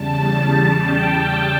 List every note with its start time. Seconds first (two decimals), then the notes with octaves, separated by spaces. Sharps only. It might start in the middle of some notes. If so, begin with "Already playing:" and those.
Already playing: E2 C#3 G3 A5
0.34 A5
0.82 G5